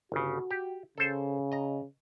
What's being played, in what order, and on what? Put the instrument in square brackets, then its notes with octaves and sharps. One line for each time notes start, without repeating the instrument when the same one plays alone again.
[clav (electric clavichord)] G1 C#3 [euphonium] F#4
[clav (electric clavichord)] G4
[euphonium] C#3 [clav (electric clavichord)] A4 C5
[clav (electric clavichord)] D#5 A#5